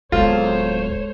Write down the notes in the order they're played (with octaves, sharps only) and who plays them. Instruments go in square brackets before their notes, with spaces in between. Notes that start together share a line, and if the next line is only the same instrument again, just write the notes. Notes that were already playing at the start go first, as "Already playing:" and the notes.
[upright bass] D1 B3 [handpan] G#3 A4 [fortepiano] F4 [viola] C5 C#5